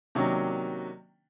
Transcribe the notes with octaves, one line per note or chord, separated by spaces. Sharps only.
C3 D#3 F#3 A#3 C#4 D4